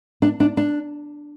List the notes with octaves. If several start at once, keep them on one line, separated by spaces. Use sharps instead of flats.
D4
D4
D4